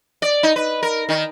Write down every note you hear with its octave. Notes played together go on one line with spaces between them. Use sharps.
D5
D#4
B4
A#4
D#3